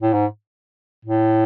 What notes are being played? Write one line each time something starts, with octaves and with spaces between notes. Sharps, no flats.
A2
G#2
A2